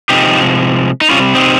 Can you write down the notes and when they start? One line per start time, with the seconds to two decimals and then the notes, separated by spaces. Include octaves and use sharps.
0.09 C3 F3 G#3 D#4 G4
1.01 D#4
1.10 C3 G3 C#4 F4
1.35 C4 D#4